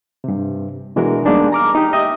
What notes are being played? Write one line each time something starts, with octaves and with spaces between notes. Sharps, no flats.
G2 C3
B2 E3 G#3 D4 F#4 A#4
G3 G#3 A#3 B3 D4 D#4
A#5 D6 F6
D#4 G4
D#5 E5 G5 D#6